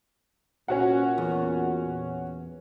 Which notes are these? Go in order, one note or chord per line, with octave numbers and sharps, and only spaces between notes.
A#2 C#4 F#4 F#5
E2